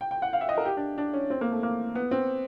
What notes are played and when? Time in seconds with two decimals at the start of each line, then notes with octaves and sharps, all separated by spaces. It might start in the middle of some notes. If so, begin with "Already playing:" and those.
0.01 G5
0.11 G5
0.22 F#5
0.33 F5
0.41 E5
0.49 D#5
0.58 A#4
0.65 G4
0.77 D4
0.98 D4
1.14 C#4
1.30 C4
1.41 A#3
1.52 A3
1.63 A#3
1.95 B3
2.11 C4